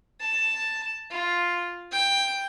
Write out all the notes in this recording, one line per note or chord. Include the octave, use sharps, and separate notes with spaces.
A5
F4
G5